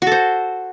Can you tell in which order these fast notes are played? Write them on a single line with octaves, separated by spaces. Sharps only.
F#4 A4 C5